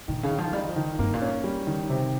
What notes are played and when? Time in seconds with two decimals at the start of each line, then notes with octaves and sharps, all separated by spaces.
0.08 A#2 D#3
0.23 C#3
0.31 D#3
0.38 F3
0.53 G3 D#4
0.68 F3
0.76 D#3
0.99 G2 A#3
1.14 A#2
1.22 C#4
1.44 G3
1.67 D#3
1.89 C3